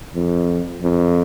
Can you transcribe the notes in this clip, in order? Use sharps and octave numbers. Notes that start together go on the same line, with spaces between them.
F2
F2